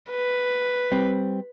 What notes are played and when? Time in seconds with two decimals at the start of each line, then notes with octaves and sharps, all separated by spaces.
0.11 B4
0.92 G3 C4